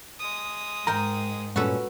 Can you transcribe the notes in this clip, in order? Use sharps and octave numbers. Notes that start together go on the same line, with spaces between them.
G#3 D#6
G#2 A#4 G5 A#5
G2 A#2 C#4 F#4 A4 B4